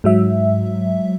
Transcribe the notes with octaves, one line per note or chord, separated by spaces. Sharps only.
G#2 F#3 E5